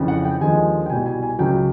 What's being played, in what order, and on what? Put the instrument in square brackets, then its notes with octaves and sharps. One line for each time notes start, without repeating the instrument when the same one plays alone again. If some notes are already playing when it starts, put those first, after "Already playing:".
Already playing: [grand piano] F2 C#3 E3
F#5
G5
D#2 D3 F3 G#3 G#5
G5
C2 B2 G3 G#5
G#5
G#5
C#2 C#3 F#3 G5